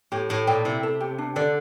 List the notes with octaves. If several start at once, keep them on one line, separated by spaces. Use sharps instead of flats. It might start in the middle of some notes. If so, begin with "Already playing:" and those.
A2 G4
A2 A4
A#2 G5
C3 E4
A4
G4
D4
D3 D5